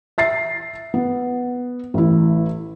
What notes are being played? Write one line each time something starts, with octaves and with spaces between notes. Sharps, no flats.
E5 A6 C7
B3
A1 E4